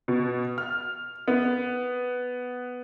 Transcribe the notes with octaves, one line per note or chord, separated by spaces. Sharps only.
B2
F6
B3